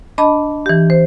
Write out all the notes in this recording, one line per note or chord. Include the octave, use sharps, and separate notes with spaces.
D4 D#5 A5 B5
E3 G4
C5